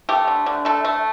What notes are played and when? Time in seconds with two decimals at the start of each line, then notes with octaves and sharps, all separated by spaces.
0.09 A3 G4
0.27 D3
0.46 D3
0.65 A3 A4
0.85 A3